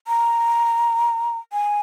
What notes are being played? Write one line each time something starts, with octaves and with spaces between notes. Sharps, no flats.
A#5
G#5